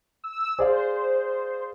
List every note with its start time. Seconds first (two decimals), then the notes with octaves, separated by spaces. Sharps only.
0.24 E6
0.59 G#4 C5 D5 F5